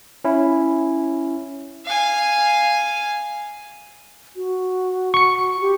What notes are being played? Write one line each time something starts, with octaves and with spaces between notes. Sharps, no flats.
C#4 E4
F5 G#5
F#4
C#6 C#7
G4